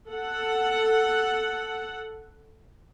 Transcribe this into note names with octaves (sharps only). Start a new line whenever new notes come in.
A4 F#5